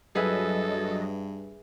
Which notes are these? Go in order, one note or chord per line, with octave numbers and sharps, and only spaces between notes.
G2 F#3 G#4 A4 B4 D#5 E5